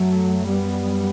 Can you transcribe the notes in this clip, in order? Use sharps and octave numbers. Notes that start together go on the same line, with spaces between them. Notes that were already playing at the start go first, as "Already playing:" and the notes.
Already playing: F#2 F#3 A3
G3 B3